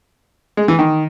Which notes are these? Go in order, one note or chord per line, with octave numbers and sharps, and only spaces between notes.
G#3
E3
D#3